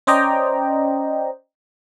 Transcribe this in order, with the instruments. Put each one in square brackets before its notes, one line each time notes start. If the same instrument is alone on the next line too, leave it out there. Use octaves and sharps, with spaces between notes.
[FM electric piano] C#4 C5 D5 D#5 G5 A#5